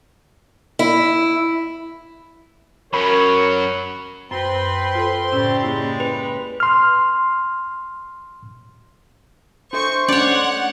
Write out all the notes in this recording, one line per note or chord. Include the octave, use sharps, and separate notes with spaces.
E4
F#2 F#3 A#4 C#5 B5 C#6
F#2 C4 B4 C6
F4 A4 C5
A2 C#3 G3 C#4 E6
G#3 A#3 E4
B4
C6 F6
D4 A4 C5 E5 C#6
A3 C#4 D4 C#5 D5 F#5